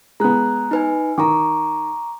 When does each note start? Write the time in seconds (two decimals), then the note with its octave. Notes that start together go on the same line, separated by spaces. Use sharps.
0.20 G#3 B3 A#5 F#6
0.71 D#4 B4 G#5
1.18 D#3 A#5 C#6 D6